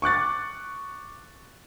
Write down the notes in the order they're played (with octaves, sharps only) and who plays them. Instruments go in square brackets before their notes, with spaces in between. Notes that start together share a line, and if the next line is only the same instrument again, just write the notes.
[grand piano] C#6 D6 F#6 A6